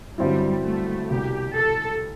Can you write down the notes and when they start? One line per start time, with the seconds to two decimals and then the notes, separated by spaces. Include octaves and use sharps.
0.18 G1 G2 F#3 G3 C4 E4
0.64 A3
1.10 C2 B2 G3 G4
1.55 A4